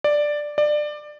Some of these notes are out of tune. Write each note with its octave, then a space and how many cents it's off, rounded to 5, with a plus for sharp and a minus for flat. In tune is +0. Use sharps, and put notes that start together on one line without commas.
D5 +5
D5 +20